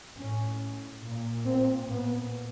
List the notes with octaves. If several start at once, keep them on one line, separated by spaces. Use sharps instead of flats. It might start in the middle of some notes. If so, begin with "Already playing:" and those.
A2 C#4
A#2
C4
A#2 B3